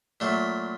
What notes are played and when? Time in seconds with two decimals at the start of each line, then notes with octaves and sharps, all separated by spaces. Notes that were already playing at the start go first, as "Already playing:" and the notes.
0.20 A#2 F#3 A3